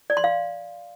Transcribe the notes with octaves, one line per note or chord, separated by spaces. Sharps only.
D5
C6
F5